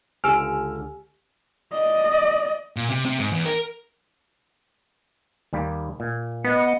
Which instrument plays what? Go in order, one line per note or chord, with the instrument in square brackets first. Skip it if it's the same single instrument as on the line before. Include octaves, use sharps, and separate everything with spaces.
[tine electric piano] C#2 D3 [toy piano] G4 G#5 [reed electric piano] E6 F6
[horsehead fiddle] D5 D#5
[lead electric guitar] A#2
C3
C3
G#2
E2
A#4
[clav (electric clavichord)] D#2 G3 A#3
A#2
[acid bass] B3 [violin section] D#5 C#7